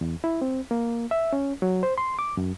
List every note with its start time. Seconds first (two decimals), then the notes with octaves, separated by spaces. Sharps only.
0.01 E2
0.24 E4
0.42 C4
0.71 A#3
1.11 E5
1.33 C#4
1.62 F#3
1.83 C5
1.98 C6
2.19 D6
2.37 F#2